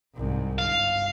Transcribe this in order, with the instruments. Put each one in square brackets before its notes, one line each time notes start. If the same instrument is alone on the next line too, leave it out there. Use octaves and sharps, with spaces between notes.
[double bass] C2 G#2
[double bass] G1 [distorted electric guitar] F5